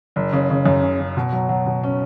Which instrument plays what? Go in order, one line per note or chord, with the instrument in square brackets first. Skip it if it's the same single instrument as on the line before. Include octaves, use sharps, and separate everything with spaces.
[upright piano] F#1
C#3
C#3
F#2
C#3
C#3
B2
F#3
F#3
B2
C#4